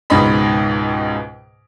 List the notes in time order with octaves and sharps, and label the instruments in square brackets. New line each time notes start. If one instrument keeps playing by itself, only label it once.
[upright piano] C#2 G#2 B2 G#4 D#5 B5